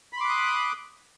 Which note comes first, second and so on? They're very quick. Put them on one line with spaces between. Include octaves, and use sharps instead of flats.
B5 C6 D6 F#6 D#6